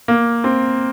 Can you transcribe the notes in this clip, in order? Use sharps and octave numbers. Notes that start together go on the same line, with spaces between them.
A#3
C4